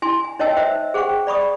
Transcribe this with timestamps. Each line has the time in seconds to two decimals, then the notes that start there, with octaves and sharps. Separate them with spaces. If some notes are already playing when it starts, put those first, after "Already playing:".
0.02 E4 G#5 C6
0.24 G#5
0.39 D#4 C#5 D#5 G5 A5 E6
0.57 C5 E5 E6
0.94 G#4 C5 F#5 G5 C#6
1.27 D5 B5 C#6 D#6